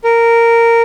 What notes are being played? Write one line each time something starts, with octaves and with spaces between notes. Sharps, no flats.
A#4